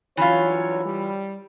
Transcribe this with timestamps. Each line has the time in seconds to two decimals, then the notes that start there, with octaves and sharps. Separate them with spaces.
0.17 G2 E3 F#3 C#4 F4 C#5
0.85 G3